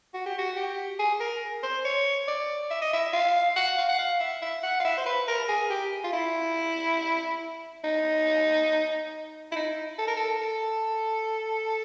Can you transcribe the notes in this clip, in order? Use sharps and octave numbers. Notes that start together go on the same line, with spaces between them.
F#4
G4
F#4
G4
G#4
A#4
C5
C#5
D5
E5
D#5
E5
F5
F#5
F5
F#5
F5
E5
E5
F#5
F5
E5
C5
B4
A#4
G#4
G4
F4
E4
D#4
E4
D#4
A4
A#4
A4
A4